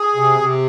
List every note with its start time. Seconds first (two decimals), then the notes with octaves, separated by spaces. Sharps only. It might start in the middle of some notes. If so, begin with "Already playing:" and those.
Already playing: G#4
0.15 C3
0.39 C3